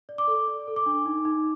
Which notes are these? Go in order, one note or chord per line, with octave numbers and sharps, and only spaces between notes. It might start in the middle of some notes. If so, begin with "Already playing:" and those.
D5
D6
A4
D5
A4
D6
D4
D#4
D#4